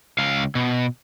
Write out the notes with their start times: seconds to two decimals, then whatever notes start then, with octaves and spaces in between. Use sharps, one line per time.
0.19 C#2 F5
0.55 B2